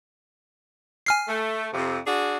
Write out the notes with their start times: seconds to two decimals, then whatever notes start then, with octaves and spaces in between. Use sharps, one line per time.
1.06 G#5 F6 C7
1.28 A3
1.74 F2 C3
2.07 D4 F#4 G#4